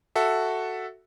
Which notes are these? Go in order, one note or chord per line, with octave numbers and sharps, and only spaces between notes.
F#4 A4 E5